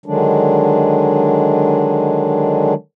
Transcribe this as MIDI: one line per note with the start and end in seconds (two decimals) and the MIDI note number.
0.06 2.74 50
0.06 2.74 51
0.06 2.74 54
0.06 2.74 56
0.06 2.74 62